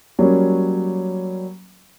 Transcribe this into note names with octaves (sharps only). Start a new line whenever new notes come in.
F#3 G3 A#3 C#4